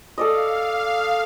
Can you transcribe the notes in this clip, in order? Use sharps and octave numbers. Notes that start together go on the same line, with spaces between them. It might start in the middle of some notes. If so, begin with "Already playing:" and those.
A4 D5 D#5 F5